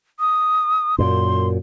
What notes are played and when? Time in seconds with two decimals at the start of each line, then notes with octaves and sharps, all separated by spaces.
0.20 D#6
0.98 F#2 A#2 C6